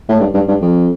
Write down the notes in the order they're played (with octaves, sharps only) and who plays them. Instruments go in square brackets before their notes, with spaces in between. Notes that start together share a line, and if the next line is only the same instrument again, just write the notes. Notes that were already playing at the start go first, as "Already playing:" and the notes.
[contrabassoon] A2
G2
G2
G2
F2